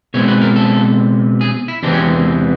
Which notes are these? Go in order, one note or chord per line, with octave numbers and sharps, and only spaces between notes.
B2 G#3 C4 C#5
B4
A#4
A4
G#4
E4
E2 C3 E3 G#3 C4 D4
C#4